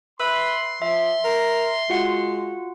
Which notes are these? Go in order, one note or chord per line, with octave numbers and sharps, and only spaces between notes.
B4 E5 C6 E6
F3 E5
A#4
G#3 F4 F#4 F#5